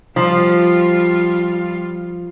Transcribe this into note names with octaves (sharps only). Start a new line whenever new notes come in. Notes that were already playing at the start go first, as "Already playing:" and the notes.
F3 G3 F4